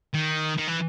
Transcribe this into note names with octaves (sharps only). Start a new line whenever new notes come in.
D#3
D#3
E3